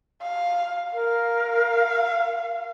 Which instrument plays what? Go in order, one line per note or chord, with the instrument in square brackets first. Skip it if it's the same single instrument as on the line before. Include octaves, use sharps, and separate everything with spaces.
[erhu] F5
[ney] A#4 [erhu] F5